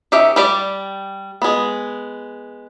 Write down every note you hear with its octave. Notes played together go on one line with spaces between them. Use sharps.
D#3 C#4 G4 E5
G3 G4 D5
G#3 B3